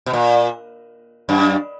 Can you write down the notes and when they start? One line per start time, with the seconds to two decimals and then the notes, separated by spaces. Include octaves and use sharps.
0.06 B2
0.13 A#2
1.29 F#2